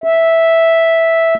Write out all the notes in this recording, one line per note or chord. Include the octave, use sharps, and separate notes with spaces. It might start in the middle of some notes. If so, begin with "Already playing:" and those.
E5